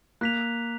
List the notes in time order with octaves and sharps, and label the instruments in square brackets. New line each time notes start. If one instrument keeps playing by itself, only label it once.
[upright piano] A#3 [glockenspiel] F#6 B6 F7